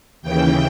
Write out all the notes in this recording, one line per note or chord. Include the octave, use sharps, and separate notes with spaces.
D#2 C#3 E3 G5